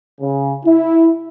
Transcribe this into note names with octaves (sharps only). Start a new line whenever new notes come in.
C#3
E4